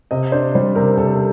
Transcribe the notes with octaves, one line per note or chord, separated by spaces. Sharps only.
C3 D#5
D4 C5
G3 C5
C3 A#4
C3 A4
A4